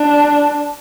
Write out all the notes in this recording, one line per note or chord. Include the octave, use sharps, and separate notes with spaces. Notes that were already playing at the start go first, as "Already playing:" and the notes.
Already playing: D4